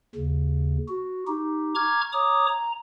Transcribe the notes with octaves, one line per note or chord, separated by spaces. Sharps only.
D#2 C#3
F#4
D#4 G4
A#5 C#6 D6 F6 G#6
C#5 A#5 D6 D#6
A#5